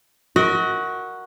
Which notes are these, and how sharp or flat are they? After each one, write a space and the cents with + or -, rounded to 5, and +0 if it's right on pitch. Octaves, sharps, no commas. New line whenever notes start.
F#4 +0 A#4 +0 D#5 +40